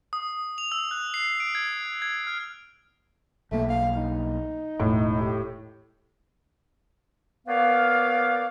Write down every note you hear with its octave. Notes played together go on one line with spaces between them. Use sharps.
D#6
F7
E6
F#6
C7
D7
G#6
G#6
F6
B1 A3 A#3
F5
D#4
E1 A2
G4
A#3 B3 B4 C#5 D5 F5